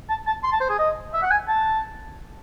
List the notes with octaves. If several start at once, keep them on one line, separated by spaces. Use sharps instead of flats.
A5
A5
C6
A5
C5
G#4
D#5
E5
F#5
G#5
A5